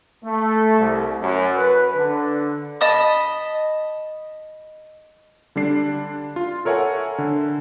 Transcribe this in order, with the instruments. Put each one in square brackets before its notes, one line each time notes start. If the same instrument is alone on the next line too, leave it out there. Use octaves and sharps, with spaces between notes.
[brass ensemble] A3
C2
F#2
B4
D3
[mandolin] D#5 A5 B5 D#6
[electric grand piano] D3 G3 D4 C7
F4
A4 A#4 C#5 E5 F#5 G#5
D3